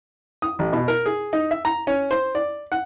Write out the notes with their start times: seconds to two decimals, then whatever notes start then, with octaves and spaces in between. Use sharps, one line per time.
0.42 D#6
0.59 A1
0.73 B2
0.88 A#4
1.06 G#4
1.33 D#4
1.51 E5
1.65 A#5
1.87 C#4
2.11 C5
2.35 D5
2.72 F#5